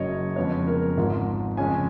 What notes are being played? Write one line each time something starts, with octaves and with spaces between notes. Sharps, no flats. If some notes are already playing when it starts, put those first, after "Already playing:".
Already playing: F#1 F#2 C#3 F#3 C#4 C#5 D#5
F2 C#3 G#3 B3 C#5
A#4
G#1 G#2 F3
F2 C#3 G#3 C#4 G#5